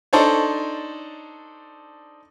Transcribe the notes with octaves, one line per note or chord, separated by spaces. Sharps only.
D4 D#4 A4 C5 C#5